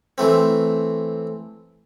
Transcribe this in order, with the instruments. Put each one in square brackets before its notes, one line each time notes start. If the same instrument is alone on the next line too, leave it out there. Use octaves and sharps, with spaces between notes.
[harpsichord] E3 A3 C4